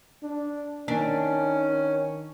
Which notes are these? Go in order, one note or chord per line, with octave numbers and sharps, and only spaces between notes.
D4
D#3 C#4 D4